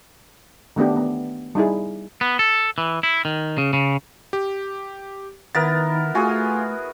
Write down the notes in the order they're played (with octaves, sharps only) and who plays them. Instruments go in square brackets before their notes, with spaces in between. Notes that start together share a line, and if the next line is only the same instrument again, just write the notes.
[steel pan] D#3 A3 B3 D4 G4
B3
G3 D#4 E4 G#4
[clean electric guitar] B3
A4
E3
E4
D#3
C#3
C#3
[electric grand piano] G4
[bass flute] D#3 [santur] B3 E4 A#4 [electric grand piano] A6
[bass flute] A3 [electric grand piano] F4 G#5 [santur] F#4 G#4